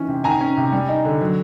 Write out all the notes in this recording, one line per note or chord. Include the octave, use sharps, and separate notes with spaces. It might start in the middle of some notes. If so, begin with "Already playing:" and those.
Already playing: D#3 E3 C#4
C3
D#3 G#5 A#5
C#4
C3
G3
D#4
D3
F#3